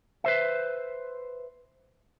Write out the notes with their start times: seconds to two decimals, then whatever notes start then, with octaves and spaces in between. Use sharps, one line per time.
0.24 B4 C5 E5